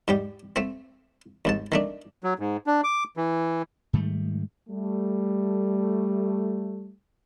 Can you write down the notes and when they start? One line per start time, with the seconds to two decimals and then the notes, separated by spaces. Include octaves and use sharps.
0.08 G#2 G3 G4
0.56 A3 C4
1.45 D#2 G#2 A5
1.72 D#3 A3 D4
2.24 F#3
2.39 G#2
2.67 D4
2.84 D6
3.17 E3
3.93 G#2 D#3 G3 A3
4.69 G3 A3